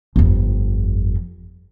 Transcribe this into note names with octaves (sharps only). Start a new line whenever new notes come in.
G1 F2